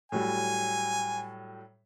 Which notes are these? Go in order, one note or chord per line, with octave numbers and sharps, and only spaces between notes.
A2 F#3 G3 G#5